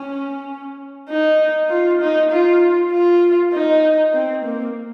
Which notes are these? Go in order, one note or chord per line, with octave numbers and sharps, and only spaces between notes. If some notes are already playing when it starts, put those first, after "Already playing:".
Already playing: C#4
D#4
F4
D#4
F4
F4
D#4
C4
A#3